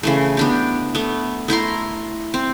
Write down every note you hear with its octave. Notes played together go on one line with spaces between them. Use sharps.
C#3 E3 A3
B3 D4 G4
A3 B3
A3 E4 A#5 C6
C4